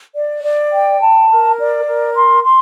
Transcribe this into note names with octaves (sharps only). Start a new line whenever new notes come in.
D5
D5
G5
A5
A#4
D5
A#4
C6
C6